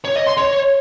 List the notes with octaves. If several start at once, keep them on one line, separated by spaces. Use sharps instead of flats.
C#5
D#5
C6
C#5